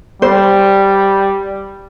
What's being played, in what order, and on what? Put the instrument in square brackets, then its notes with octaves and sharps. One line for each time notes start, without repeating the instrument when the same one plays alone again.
[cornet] G3 [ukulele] C5